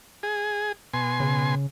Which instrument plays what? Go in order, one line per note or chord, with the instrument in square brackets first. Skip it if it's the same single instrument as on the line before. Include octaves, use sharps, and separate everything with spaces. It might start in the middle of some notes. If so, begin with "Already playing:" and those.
[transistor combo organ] G#4
B2 G#5 C6
[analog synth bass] C#3